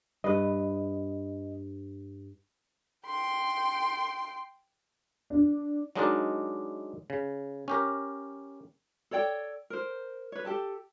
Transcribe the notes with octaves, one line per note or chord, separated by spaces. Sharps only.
G2 B4 D#5
G5 C6
D4
F#3 G#3 D4 D#4 A#4 D5
C#3
C#4 G4 A#4
A4 C#5 D5 G5
A#4 C5
B4 C#5
G4 A4 A5